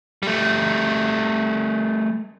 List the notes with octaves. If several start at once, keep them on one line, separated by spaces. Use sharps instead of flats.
G3 A3